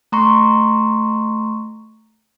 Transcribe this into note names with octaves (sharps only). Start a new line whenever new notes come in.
A3 A#5 C6 C#6